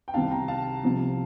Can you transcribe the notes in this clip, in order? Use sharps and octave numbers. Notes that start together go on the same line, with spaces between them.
G5
C2 C3 D#3 F5 A5
G5 A#5
F5 A5
C2 C3 F3